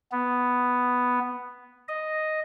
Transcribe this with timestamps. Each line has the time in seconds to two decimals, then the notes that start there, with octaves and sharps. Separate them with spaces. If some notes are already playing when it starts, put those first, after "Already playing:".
0.12 B3
1.88 D#5